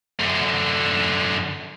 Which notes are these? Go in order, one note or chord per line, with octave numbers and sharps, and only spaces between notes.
F#2 D3